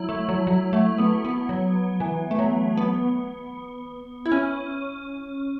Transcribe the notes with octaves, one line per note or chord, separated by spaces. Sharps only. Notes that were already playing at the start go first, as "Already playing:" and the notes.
Already playing: F#3 E4
A3
F#3
F#3
A3
B3
B3
F#3
E3
A3
F#3
B3
E4
C#4